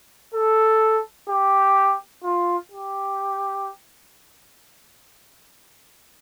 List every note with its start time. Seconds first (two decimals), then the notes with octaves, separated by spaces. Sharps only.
0.34 A4
1.29 G4
2.24 F4
2.72 G4